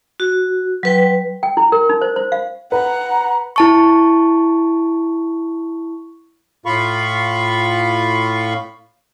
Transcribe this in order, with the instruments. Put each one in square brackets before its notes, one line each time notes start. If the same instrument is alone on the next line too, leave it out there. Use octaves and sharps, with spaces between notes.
[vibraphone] F#4
F#3 B4 G5
[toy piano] G5
E4
A#4
D#4
C5
C5
F5
[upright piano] B4 [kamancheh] F#5 [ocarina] A#5
[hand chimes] E4 A5 C#6
[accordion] A2 F4 F5 B5 C#6